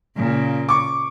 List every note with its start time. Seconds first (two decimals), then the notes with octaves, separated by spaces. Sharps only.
0.16 A#2 C#3
0.69 C#6 D6